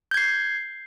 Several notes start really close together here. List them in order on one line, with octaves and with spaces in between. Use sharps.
G6 G#6 C7